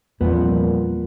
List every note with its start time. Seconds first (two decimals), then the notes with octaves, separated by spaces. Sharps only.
0.21 E2 A#2 F3 G3 B3 C4